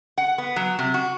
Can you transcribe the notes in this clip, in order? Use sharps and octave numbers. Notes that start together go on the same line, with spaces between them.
F#5
B3
F#3
C3
F#4